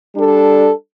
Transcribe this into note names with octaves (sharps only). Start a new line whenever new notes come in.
G3 D4 A4